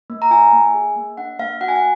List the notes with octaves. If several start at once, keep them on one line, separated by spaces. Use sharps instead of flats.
A#3
A#5
F4 G#5
A#3
G#4
A#3
D4 F#5
A#3 F5
F#4 F#5
G#5
F#5